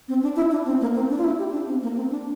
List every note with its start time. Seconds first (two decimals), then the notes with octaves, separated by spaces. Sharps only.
0.08 C4
0.22 D4
0.36 E4
0.51 D4
0.65 C4
0.81 A#3
0.94 C4
1.10 D4
1.18 F4
1.24 E4
1.39 G4
1.52 D4
1.67 C4
1.82 A#3
1.96 C4
2.10 D4